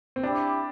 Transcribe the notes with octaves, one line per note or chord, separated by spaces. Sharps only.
C4
D4 E4 G4 D5